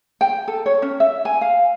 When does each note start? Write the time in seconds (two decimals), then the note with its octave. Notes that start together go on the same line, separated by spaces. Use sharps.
0.21 G5
0.48 A4
0.66 C#5
0.82 C#4
1.00 E5
1.25 G#5
1.41 F5